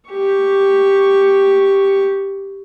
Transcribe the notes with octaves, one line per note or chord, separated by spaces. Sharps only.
G4 C#6